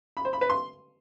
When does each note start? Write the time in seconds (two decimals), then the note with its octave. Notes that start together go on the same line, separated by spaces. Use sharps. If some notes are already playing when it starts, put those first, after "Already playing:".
0.17 B5
0.25 C5
0.33 B5
0.41 B4
0.50 C6